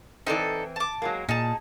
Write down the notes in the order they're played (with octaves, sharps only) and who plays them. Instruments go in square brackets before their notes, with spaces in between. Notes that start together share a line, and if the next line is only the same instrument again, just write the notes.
[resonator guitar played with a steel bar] E3 C4 [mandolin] D#4 A4 D5
[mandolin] A5 D6
[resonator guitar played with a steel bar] F#3 G#3 A#3
[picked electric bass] A#2 [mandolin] D#4 A5 [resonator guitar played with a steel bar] G#4